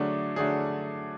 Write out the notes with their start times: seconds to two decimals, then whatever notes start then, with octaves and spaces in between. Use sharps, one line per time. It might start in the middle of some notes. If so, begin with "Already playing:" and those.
Already playing: D3 F#3 A3 D4 G#4
0.36 D3 F#3 A3 D4 G#4